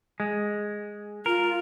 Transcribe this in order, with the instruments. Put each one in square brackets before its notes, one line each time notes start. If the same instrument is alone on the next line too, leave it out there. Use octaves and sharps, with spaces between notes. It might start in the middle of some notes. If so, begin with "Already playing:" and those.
[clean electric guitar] G#3
[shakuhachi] F4 [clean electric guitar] A#4